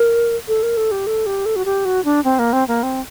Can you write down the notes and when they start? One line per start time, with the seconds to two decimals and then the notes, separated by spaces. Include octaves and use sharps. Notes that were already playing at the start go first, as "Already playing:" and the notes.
Already playing: A#4
0.48 A4
0.63 A#4
0.77 A4
0.91 G4
1.07 A4
1.26 G4
1.46 A4
1.56 F#4
1.65 G4
1.85 F#4
2.05 D4
2.24 C4
2.39 A#3
2.53 C4
2.68 A#3
2.83 C4